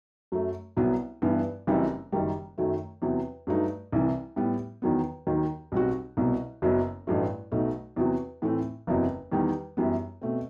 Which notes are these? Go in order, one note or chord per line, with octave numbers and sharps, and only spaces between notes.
F#2 F#3 A3
C2 C3 F#3 B3
G2 E3 B3
F#1 F#2 E3 G3 C4
F#1 F#2 D#3 G3
F#2 D#3 F#3 A3
E2 C3 F#3
G2 F#3 A3 D#4
C2 C3 E3
A2 G3 B3
E2 D#3 F#3 B3
D#2 D#3 F#3
B1 B2 G3 C4 F#4
C2 B2 F#3
F#1 F#2 F#3 B3
A1 G2 F#3 A3
B1 B2 A3 D#4
E2 C3 F#3 C4 F#4
A2 E3 A3 C4
F#1 E2 C3 F#3
E2 D#3 G3 D#4
F#2 E3 G3 B3
B2 A3 C4